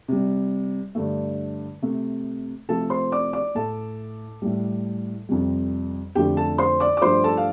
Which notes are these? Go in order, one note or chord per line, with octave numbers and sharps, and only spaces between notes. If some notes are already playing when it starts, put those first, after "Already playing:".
C3 G3
G2 D3 A3
C3 A3
C3 F3 A3 A4 A5
C5 C6
D5 D6
D5 D6
A2 A3 A4 A5
A2 G3
F2 C3 G3
F2 D3 F3 A3 G4 G5
A4 A5
C5 C6
D5 D6
D6
G2 F3 A3 C5 C6
A4 A5
F5